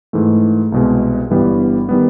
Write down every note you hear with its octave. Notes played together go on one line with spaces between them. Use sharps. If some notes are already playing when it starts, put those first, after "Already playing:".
G#2 E3 A3
C2 B2 G#3
G1 G2 E3 G3 B3
D#3 G3 B3